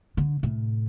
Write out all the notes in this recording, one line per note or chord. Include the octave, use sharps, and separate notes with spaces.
D3
A2 C3